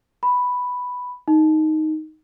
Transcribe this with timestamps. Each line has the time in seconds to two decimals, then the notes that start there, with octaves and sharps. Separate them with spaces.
0.23 B5
1.28 D#4